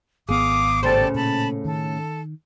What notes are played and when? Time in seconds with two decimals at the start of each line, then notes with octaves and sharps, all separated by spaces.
0.29 G#1 B3 G#4 F5 D6 D#6
0.83 A2 C#3 G4 A4 C5 D5
1.14 A#2 A5 B5
1.65 D#3 A4